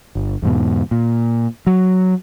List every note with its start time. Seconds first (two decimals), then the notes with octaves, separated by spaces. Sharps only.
0.15 G1
0.42 E2 G#2 B2
0.91 A#2
1.67 F#3